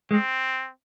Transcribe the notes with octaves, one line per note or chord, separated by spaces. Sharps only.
G#3 C4